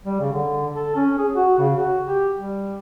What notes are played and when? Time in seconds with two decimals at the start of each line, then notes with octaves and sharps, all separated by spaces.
0.06 G3
0.20 C#3
0.32 D3
0.74 A4
0.96 C#4
1.18 G#4
1.35 F#4
1.59 C#3
1.77 F#4
2.07 G4
2.35 G3